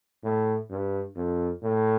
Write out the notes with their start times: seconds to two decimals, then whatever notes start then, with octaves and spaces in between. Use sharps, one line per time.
0.24 A2
0.70 G2
1.16 F2
1.63 A2